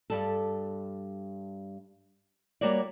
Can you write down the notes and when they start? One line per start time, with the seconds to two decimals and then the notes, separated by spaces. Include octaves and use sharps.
0.10 G2 G3 A4
2.61 G3 A#3 F#4 C#5 D5